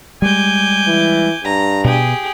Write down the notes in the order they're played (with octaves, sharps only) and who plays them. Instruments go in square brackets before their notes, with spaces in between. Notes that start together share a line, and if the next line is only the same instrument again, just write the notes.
[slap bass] G3 G#3 [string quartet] G#5 D6 G6
[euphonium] E3
[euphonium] G2 [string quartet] A#5
[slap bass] B2 [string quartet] G4 G#4